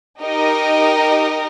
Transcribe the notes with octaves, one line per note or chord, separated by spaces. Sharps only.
D#4 G4 A#4 D#5